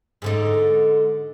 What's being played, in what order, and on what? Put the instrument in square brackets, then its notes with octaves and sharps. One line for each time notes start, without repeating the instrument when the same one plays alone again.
[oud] G#2 D3 D#4